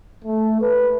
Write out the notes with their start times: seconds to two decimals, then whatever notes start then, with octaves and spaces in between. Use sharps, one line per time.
0.24 A3
0.61 B4